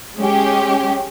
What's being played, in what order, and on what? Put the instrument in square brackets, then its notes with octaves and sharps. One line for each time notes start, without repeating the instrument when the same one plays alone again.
[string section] G#3 C#4 G4